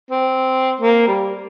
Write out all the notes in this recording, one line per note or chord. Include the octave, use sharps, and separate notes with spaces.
C4
A#3
G3